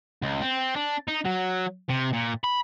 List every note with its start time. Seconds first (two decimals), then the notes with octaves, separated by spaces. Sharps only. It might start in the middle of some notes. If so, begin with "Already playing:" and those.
0.22 C#2
0.41 C4
0.76 D4
1.08 D#4
1.25 F#3
1.90 C3
2.13 A#2
2.44 B5